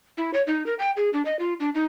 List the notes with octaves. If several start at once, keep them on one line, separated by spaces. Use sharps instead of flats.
E4
C#5
D#4
A#4
G5
G#4
D4
D#5
F4
D4
D#4